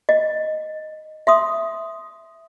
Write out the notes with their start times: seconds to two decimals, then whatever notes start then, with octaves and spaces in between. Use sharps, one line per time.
0.09 D#5
1.27 E5 C6 D#6